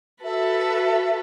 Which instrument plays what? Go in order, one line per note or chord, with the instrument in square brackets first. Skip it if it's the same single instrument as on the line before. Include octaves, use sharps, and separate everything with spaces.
[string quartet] F#4 A4 B4 [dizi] E5